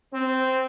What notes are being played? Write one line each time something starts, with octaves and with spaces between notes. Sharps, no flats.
C4